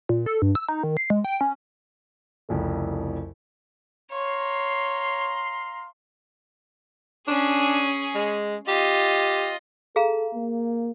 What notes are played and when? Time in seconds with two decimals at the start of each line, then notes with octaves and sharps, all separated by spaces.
0.09 A#2
0.26 A4
0.42 G2
0.55 E6
0.69 D#4
0.83 D#3
0.97 C7
1.10 G#3
1.24 G5
1.41 C#4
2.49 C2 F2 C#3 A3
4.12 C#5 F5 A#5 C6
7.28 C#4 D4 G#4
8.15 G#3
8.68 F4 G4 D#5
9.96 G#4 A4 F5 A#5
10.34 A#3